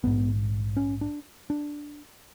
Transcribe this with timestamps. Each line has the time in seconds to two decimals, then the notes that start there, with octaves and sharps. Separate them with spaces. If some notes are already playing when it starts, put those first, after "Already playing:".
0.03 A#1 G#2 B3
0.77 C#4
1.01 D4
1.50 D4